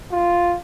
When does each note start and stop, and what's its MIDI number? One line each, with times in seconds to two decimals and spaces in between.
0.12 0.55 65